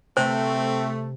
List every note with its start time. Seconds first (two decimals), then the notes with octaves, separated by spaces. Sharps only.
0.17 C3 A3 C4 C5